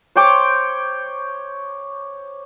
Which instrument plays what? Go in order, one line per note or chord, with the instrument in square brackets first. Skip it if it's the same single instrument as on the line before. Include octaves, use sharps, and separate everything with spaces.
[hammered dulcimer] C5 C#5 G5 D6